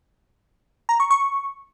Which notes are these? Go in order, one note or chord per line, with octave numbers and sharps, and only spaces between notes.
A#5
C#6
C#6